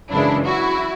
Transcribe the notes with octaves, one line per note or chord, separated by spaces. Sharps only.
F#2 C#3 E3 G#3 D4 E4
E4 F#4